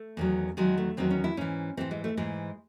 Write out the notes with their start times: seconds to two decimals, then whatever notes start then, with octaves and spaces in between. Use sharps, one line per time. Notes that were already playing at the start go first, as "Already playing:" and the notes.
Already playing: A3
0.17 E2 D#3 F#3
0.57 E2 D#3 F#3 G#3
0.77 A3
0.97 E2 D#3 F#3 C4
1.10 C#4
1.24 E4
1.37 G#2 E3 C#4
1.77 G#2 E3 C4
1.91 G#3
2.04 A3
2.17 G#2 E3 G#3